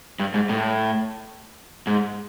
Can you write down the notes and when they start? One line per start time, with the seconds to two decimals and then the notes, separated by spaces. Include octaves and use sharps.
0.19 G2
0.34 G#2
0.49 A2
1.87 G#2